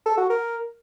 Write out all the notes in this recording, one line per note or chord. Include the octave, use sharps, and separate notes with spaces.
A4
F#4
A#4